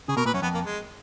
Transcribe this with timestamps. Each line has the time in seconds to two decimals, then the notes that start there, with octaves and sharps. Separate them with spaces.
0.08 C#3 G#4
0.17 B2 A#4
0.25 A#2 B4
0.34 F#2 C#4
0.42 F2 B3
0.54 A#3
0.65 G#3